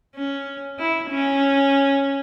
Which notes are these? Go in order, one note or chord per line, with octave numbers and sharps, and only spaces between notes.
C#4
E4
C#4